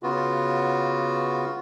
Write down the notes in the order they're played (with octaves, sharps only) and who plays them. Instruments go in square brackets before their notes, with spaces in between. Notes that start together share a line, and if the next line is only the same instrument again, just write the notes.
[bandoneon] C#3 B3 F4 F#4